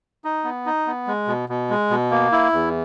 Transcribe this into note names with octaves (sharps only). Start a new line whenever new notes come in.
D#4
B3
D#4
B3
G#3
B2
B2
G#3
B2
A#3
E4
E2